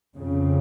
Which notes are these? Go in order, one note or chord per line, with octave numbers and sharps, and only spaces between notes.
F2 C#3